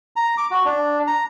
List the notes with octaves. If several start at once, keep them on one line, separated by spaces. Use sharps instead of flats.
A#5
D6
F#4
D4
A#5